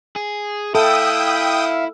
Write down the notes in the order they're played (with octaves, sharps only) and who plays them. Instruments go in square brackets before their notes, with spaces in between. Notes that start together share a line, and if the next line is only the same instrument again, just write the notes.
[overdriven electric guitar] G#4
[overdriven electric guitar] E4 [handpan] A4 [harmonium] E5 F5 [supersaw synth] G5 D#6